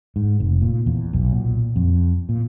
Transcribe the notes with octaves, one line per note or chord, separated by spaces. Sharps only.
G#2
F1
A#2
E2
B1
A#2
F2
A#2